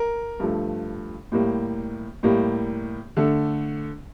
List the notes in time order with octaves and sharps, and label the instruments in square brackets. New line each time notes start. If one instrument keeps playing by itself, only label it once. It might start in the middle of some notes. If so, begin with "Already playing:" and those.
Already playing: [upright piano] A#4
G2 F3 A3
A2 G3 A#3
A2 G3 A#3
D3 A3